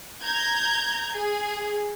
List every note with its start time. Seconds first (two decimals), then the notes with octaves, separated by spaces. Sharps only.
0.23 A#5 G6 G#6
1.16 G#4